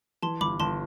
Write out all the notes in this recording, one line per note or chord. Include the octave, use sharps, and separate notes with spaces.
E3 A5 C6
G1 B5 D6
G1 A5 C6